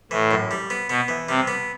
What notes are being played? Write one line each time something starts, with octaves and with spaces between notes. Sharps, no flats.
A2 E3
F#2
G3
B3
B2 B3
E3
C3 G3
B3